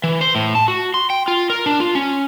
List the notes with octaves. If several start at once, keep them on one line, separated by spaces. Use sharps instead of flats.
E3
C5
A2
A5
F#4
C6
G5
F4
A#4
D4
F4
C#4